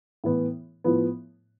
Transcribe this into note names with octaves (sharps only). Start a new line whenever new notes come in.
A2 E3 B3
A2 F3 B3